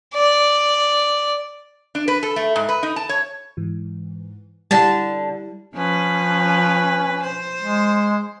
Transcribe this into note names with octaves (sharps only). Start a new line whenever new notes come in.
D5
D4
B4
A4
A3
G#2
B4
D#4
A5
C#5
G#2 E3
D3 G3 E4 A5
F3 C#4 B4
C5
G#3